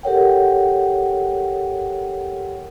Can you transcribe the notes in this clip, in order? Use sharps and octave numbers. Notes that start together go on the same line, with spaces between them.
G4 A4 A#4 C#5 F#5 G5